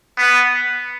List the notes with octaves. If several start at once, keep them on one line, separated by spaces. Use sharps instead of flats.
B3